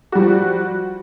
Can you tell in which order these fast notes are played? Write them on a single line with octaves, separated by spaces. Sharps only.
F#4 G3 F3